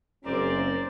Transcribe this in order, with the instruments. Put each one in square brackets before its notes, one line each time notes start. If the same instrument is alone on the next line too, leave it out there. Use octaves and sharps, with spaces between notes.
[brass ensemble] F#1 [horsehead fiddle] C4 A#4 [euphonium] C#4 [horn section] C5 D5